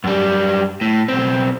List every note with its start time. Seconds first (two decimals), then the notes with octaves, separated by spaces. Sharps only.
0.04 F#2 G3
0.81 A2
1.08 B1 C4